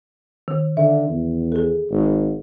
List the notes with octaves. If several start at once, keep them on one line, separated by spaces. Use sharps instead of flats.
D#3
D3 E5
E2
G#4 A4
G#1